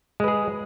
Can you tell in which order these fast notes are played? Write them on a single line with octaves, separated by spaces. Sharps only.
G#3 B4 G#4